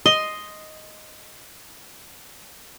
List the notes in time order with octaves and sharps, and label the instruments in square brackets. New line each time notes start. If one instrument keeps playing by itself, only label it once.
[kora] D#5 [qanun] C6